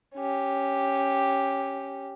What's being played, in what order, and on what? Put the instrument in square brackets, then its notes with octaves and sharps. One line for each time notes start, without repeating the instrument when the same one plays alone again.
[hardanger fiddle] C#4 G4